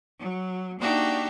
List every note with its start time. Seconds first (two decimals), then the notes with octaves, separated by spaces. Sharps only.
0.19 F#3
0.79 A#3 D4 D#4 F#4 G4 E5